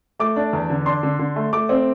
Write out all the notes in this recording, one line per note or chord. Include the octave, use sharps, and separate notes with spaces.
A3 D6
D4
E2
D3
D4 C6
D3
D3
A3
A3 D6
C4